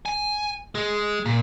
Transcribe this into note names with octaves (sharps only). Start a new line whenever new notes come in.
G#5
G#3
A#2